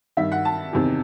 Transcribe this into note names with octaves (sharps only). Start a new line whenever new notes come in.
G2 D#3 E5
F#5
A5
E2 C3 D#3